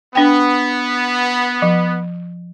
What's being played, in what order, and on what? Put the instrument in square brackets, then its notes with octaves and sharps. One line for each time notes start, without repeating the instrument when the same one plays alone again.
[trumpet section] B3 [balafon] D4 G5
[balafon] F3